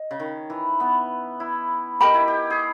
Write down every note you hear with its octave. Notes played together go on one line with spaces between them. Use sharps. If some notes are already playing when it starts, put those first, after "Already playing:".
Already playing: D#5
C#3
D#3
E3
B3
E4
G4 A#4 D#5 G5 B5
E4
G4
G#4